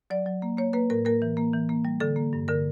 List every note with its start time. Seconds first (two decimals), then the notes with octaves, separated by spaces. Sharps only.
0.10 F#3 D5
0.26 F#3
0.42 A#3
0.57 A#3 C#5
0.73 A#3 B4
0.90 A2 A#4
1.05 A#3 A#4
1.22 E3
1.37 A#3
1.53 E3
1.69 A#3
1.85 G3
2.00 D3 A4
2.16 A#3
2.33 G2
2.48 D3 A#4